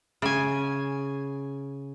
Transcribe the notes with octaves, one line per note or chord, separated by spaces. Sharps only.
C#3 G#5